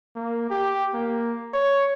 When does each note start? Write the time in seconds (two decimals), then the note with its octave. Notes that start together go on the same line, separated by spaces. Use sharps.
0.16 A#3
0.50 G4
0.94 A#3
1.53 C#5